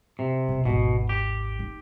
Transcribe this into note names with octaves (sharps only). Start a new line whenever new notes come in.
C3
B2 D3
G#1 D#2 B2
G4
D#4